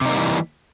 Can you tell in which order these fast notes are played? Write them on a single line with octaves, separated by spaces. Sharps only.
C3 D#4 A#3 G3 E3